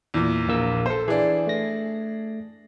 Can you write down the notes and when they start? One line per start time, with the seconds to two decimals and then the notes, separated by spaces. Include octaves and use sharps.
0.14 E2 A#2
0.48 A#1 A#3 E6
0.86 A4 C5
1.08 E3 D4 G#4
1.47 A3 A#6